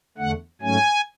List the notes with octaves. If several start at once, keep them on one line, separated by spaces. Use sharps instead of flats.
E2 D3 A3 F#5
G#2 F#3 A3 C#4 G#5